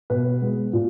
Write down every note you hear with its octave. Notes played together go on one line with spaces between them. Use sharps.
B2 B4
G#3 B3
A#2